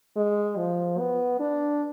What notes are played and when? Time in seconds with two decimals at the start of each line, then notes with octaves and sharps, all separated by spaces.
0.17 G#3
0.57 F3
0.99 B3
1.40 D4